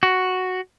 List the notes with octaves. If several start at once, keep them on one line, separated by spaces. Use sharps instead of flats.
F#4